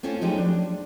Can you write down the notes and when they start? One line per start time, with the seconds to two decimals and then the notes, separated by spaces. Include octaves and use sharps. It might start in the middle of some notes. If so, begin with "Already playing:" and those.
0.03 A3 C4 C#4 F4
0.21 F3 F#3 G#3 A3 D#4 G4
0.38 D4